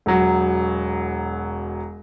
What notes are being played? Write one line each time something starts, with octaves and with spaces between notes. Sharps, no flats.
E1 F#3